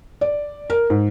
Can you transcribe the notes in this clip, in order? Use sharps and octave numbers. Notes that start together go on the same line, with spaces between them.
D5
A#4
G#2